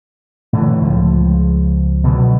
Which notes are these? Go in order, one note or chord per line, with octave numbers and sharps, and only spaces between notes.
A2 D3 E3
C#2 F3
B2 D3 E3 F#3